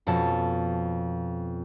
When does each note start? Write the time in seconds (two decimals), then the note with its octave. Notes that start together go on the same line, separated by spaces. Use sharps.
0.07 F2 B2 C#4 A5